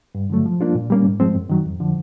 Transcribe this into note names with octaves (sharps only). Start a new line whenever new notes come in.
G2
D3 F#3 A3
F3
A#3 D4 F4
A#2
G3 A#3 C#4
G#2
F3 G#3 C4
F#2
D#3 F#3
F2
D3 F3